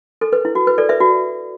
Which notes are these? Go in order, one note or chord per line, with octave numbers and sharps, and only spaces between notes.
A4
B4
E4
F#4
B4
A4 D5
B4 E5
F#4